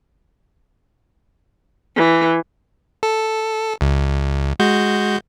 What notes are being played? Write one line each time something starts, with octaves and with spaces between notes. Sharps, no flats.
E3
A4
C#2
G#3 F#4 G6